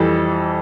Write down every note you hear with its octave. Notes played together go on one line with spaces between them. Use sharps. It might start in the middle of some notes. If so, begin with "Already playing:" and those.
Already playing: F2 E3 G3 A4